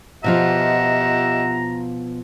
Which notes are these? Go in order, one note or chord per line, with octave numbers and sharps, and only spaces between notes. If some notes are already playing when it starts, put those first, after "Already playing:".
B2 F3 F4 G4 D#5 E5 F#5 A#5